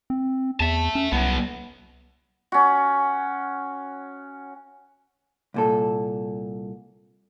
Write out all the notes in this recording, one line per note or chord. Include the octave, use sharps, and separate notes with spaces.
C4
E2 E5 A5
C#4
C2 F#3 B3
C#4 F#4
C2 A#2 A4